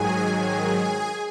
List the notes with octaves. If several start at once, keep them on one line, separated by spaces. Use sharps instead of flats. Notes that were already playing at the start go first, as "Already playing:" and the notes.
Already playing: G#2 D#3 F#3 G#4 G#5
G#4 G#5